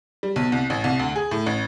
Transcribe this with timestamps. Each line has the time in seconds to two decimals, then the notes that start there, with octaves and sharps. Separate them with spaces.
0.23 G3
0.36 B1
0.52 C2
0.70 A1
0.84 C2
1.00 D2
1.16 G#4
1.31 A2
1.46 A1